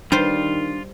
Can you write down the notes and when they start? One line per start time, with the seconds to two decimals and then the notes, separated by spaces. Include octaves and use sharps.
0.12 D#3 G3 D4 F4 C5